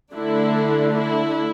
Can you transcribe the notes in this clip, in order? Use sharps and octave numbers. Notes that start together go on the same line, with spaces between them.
D3 A3 D4 E4
E4